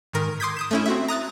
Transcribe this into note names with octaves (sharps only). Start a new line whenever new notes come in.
G#2 D#3 A#4
C6 D6 D#6 G6 G#6 B6
D#6 G6 E7
A3 C#4 E4
C4 F#4 E5
A#5 D#6 F#6 A6